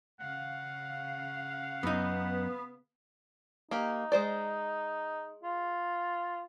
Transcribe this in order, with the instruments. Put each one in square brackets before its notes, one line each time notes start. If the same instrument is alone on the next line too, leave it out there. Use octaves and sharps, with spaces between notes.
[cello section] C#3 F5 [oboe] F#5
[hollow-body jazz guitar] F#2 D#4 [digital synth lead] B3
[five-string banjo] A#3 G4 [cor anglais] D#4
[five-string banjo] G#3 C5 D5
[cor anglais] F4